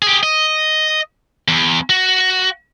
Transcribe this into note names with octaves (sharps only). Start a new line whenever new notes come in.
G4 G#4
D#5
E2
F#4